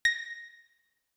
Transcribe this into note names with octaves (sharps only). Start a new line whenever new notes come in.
A#6